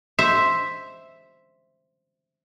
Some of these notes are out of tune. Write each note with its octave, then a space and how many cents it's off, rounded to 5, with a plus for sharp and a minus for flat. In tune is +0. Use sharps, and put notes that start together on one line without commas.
C5 +0 E5 +0